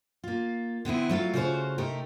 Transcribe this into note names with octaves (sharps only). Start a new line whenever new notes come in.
A#3 F4
D3 B3 C4 E4
F#3 A3 F4 F5
C#3 A3 F4 F#4 C5
C3 A3 D#4 G4 A#4